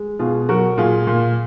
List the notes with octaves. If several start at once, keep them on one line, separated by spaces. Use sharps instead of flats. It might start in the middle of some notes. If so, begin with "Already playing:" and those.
Already playing: G#3
B2 F4 G#4
F#3 F#4 A#4
A#2 F4 G#4
A#2